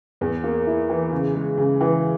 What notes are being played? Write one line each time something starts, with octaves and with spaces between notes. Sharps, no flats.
E2
A#3
E4
E3
C#3
G#3
C#3
E3